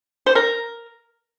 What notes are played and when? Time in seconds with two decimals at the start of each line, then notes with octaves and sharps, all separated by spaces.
0.26 C5
0.35 A#4